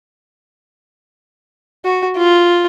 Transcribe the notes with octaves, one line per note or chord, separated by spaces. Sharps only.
F#4
F4